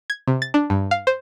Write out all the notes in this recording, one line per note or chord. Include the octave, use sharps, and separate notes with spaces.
G#6
C3
A6
D4
G2
F5
C5